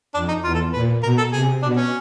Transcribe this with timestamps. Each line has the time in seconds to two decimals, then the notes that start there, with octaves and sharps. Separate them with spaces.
0.14 F2 D4
0.28 D#4
0.43 E2 F4
0.54 A4
0.73 A#2 B4
1.02 B2 A#4
1.17 A4
1.32 C3 G#4
1.62 B2 D4
1.76 C#4